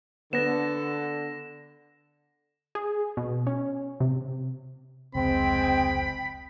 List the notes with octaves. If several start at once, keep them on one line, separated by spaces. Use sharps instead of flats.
D3 B3 A4 A#6 E7
G#4
B2
C#4
C3
F1 C#2 G#3 C4 G5 B5